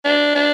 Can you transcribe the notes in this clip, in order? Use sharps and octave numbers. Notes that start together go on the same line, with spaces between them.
D4
D4